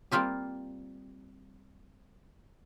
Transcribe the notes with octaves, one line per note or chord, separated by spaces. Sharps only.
G3 A#3 C4 F4 G4